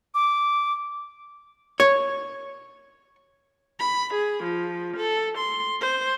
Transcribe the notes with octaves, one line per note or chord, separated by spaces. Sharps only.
D6
C#5
B5
G#4
F3
A4
C6
C5